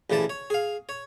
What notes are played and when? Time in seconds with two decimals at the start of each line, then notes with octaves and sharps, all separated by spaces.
0.10 A1 C#3 E3 D5 A5
0.30 C#5
0.50 G#4 F5
0.89 C#5